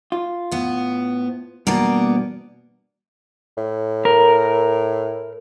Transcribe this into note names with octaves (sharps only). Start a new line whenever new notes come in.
F4
A2 B3
G2 B2 E3 A#3 B3 D5
A2
A#4